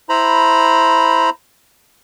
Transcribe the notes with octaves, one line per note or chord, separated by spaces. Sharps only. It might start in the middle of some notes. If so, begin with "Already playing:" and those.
E4 C5 A#5 B5